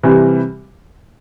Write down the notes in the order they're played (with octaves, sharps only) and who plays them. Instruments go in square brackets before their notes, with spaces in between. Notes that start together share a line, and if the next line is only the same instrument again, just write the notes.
[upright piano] C3 E3 G3